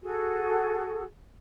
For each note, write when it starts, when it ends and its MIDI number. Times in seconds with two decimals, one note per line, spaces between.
0.02 1.02 66
0.02 1.02 68
0.02 1.02 69